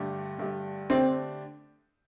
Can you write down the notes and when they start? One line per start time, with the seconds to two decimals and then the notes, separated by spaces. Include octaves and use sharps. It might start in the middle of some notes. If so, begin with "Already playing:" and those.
Already playing: G2 D3 A3 D4 G4
0.39 G2 D3 A3 D4 G4
0.90 D3 A3 C4 D4 G4